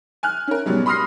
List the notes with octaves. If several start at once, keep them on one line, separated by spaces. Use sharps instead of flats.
G#5 F6 F#6
C#4 A#4
G#2 B2 F#3 G3
B5 C6 D#6 F6 A#6 C7